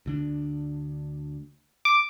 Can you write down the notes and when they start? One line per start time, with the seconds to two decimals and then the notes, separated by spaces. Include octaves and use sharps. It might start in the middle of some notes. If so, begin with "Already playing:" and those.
0.06 D2 D3 D4
1.85 D6